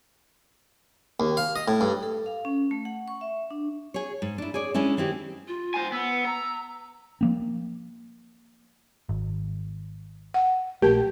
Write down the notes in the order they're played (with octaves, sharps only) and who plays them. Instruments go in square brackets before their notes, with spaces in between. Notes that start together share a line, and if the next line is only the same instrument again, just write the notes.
[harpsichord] D#2
F5
D#5
A2
G2
[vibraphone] A4
F5
C#4
A3
F#5
C#6
E5
D4
[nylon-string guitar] G#4 C#5
G#2
D4 E4
G#4 C#5 D5
G#3 C#4 D4 E4
D#3 C4 E4 G4
[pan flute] F4
[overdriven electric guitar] C5 G#5
[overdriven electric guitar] B3 [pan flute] E6
[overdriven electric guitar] A#5 [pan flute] E6
[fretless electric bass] F3 A#3 C4
[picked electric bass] G#1
[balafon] F#5
[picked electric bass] A#1 A3 [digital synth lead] G4 [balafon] A#4 A5